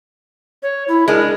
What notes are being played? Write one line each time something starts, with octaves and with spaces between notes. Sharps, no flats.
C#5
E4
G#3 D4 A#4